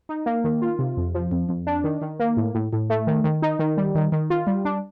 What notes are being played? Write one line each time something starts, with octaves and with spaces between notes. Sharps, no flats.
D#4
A#3
D#3
F4
C3
F2
F3
F2
F2
D4
D#3
D#3
A#3
A2
A2
A2
A3
D#3
D#3
D#4
D#3
G3
D#3
D#3
F4
G3
D4